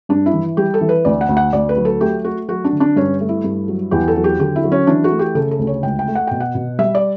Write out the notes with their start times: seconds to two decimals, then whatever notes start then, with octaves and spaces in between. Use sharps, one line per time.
0.09 G2 D4
0.26 E4
0.33 E3
0.57 G3 G4
0.74 A4
0.81 E3
0.89 B4
1.05 D2 D5
1.21 F#5
1.29 D2
1.37 F#5
1.53 D2 D5
1.69 B4
1.77 F#3
1.85 A4
2.01 A3 G4
2.24 A3 F#4
2.48 F#3 F#4
2.64 D4
2.73 D3
2.80 D4
2.96 G2 C#4
3.20 A3
3.29 E4
3.44 G2
3.68 F#3
3.91 E2 G4
4.08 A4
4.16 F#3
4.24 G4
4.39 D3 G4
4.56 E4
4.64 F#3
4.72 C#4
4.87 E3 D4
5.04 F#4
5.11 A3
5.19 G4
5.35 C#3 A4
5.51 A4
5.59 D2
5.67 C#5
5.83 C#2 G5
5.99 G5
6.07 A3
6.15 F#5
6.27 B2 G5
6.40 F#5
6.55 B2
6.79 G3 E5
6.95 D5